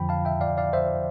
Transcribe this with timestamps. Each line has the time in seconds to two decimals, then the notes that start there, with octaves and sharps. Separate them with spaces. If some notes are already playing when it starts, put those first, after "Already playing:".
Already playing: F2 D3 F3 G5 B5
0.09 F5 A5
0.25 E5 G5
0.41 D5 F5
0.58 D5 F5
0.73 C5 E5